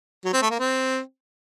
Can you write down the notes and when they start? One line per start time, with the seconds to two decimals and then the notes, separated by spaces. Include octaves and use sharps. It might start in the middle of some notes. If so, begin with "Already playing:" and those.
0.25 F#3
0.34 C4
0.42 A3
0.51 A#3
0.59 C4